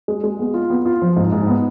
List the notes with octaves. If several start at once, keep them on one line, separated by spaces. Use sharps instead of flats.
G#3
G#3
B3
F4
B3
F4
F3
G#2
G#2
B3